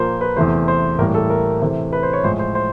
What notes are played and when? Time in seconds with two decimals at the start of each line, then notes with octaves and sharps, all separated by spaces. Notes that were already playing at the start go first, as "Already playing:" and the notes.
Already playing: A#2 F3 A#3 C5
0.21 B4
0.36 E2 C3 E3 A3 C5
0.68 C5
0.98 A2 E3 G3 A#3 A#4
1.14 A4
1.30 A#4
1.62 C3 E3 A3
1.93 B4
2.03 C5
2.13 C#5
2.24 A2 F3 G#3 C5
2.39 C5
2.55 C5